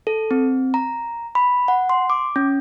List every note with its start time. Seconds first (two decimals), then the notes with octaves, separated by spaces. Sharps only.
0.07 A4
0.31 C4
0.74 A#5
1.35 B5
1.68 F#5
1.89 C6
2.10 D6
2.36 C#4